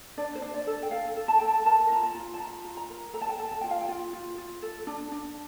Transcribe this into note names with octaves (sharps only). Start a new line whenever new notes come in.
D4 D5
C5
D4
D5
A4
G5
A4 F5
A4
A5
A4 G5
A5
A#4 A5
F4 A#5
A5
F4
A5
F4 A#5
F4
A#5
A#4
A4 A#5
A5
G5
A4 A5
A5
F4 G5
F5
G5
F4
F4
F4
A4
D4
D4